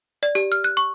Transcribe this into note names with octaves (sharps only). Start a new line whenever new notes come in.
D5
G4
F6
F#6
C#6